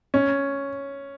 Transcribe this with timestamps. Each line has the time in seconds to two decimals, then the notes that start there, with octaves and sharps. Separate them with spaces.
0.14 C#4